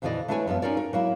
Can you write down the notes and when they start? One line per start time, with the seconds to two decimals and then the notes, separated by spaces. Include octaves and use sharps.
0.02 F2 A#2 D3 E3 D5 D#5
0.28 A3 D4 E4 B4 C#5 G#5
0.48 F#2 F3 B3 E5
0.62 C#4 D#4 F4 A#4 C#5 D5
0.77 A#4
0.93 F#3 A#3 E4